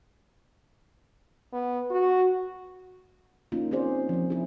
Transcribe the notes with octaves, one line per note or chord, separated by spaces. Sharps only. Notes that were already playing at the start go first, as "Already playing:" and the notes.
B3
F#4
A#3 C#4 D#4 F4
C4 C#4 D#4 G#4 C5 D5
F3 C4
E4 G#4